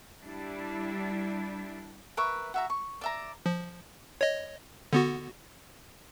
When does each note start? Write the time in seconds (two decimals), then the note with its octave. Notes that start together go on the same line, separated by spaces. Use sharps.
0.23 G3 D4 E4
2.17 A#4 B4 E5 C#6
2.54 F#4 E5 A#5
2.70 C#6
3.01 D5 E5 A#5
3.46 F3
4.21 C#5 D#5
4.93 D3 B3 F#4